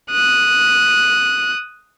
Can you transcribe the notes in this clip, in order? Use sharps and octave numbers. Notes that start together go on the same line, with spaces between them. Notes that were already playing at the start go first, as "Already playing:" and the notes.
D#6 F#6